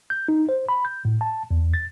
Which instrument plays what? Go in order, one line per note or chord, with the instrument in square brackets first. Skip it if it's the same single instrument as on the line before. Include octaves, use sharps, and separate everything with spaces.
[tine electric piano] G6
D#4
C5
B5
G6
A2
A5
E2
A6